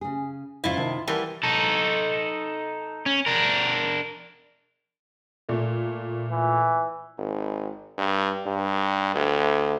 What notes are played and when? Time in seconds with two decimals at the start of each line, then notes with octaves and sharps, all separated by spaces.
0.01 C#3 G#4
0.64 F2 G#2 C#3 E4 F4
0.76 C3 D#3 A5
1.07 E3 G3 A#4 F#5 A5
1.43 D#4 A4
3.06 C#4
3.26 D4 A#4
5.49 A#2 A3
6.31 E3
7.18 G#1
7.98 G2
8.46 G2
9.15 D2